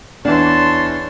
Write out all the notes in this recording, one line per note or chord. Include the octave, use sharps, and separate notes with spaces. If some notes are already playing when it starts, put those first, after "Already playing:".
E2 E3 D4 C#5 A5 C6